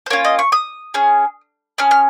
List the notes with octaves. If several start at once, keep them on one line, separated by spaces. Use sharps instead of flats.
C5
A#3 C#4 F4 C#5
D#5
C#6
D#6
C#4 G#4
C#4 G#4 F6
F6